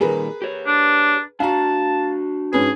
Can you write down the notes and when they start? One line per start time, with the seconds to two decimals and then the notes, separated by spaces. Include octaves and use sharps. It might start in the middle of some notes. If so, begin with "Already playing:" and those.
0.01 A#2 D#3 G3 G#4 A#4 B4
0.42 G4 C#5
0.67 D4
1.40 D4 F#4 F5 A5 A#5
2.53 G#2 C#4 G#4 B4